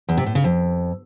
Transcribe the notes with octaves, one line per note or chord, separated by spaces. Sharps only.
E2
C3
A2
C#3
F2